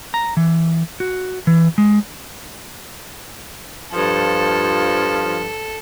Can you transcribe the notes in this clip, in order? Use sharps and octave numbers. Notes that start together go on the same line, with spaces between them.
A#5
E3
F#4
E3
G#3
G2 F3 A4